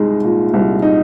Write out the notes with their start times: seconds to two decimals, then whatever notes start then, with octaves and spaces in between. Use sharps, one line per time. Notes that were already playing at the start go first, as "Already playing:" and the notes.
Already playing: C2 G#3 D#4
0.24 A#2
0.54 C2
0.82 D#4